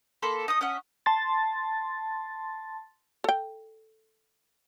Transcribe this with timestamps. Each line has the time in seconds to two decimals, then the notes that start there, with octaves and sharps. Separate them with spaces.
0.22 A#3 A4 B5 C6
0.48 D#4 D#5 D#6
0.61 C#4 D#5 E5 F#5
1.06 A5 C6 A6
3.24 A4 G5